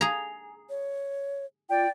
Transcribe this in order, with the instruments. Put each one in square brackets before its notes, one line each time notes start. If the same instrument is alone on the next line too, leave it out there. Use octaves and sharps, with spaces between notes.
[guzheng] G#4 A#5
[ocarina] C#5
[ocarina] F4 [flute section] D5 G5